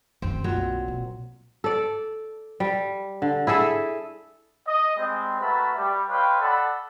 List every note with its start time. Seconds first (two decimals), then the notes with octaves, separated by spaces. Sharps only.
0.22 F#2 D#3 C4
0.44 B1 A#2 F#3
0.88 B2
1.64 A4 D5
2.60 G3
3.22 D3
3.47 E4 G#4 A4 E5
4.67 D#5
4.96 G3 G#3 C4
5.40 A3 F#4 A#4 B4 A5 B5
5.76 G3
6.08 B4 C#5 D#5 F5 G5 C6
6.41 A4 D5 F#5 B5